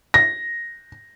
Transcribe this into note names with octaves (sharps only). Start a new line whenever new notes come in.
A#6